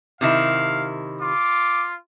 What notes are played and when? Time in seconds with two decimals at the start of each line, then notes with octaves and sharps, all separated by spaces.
0.21 C3 D#3 E4 F5
1.21 F4 D6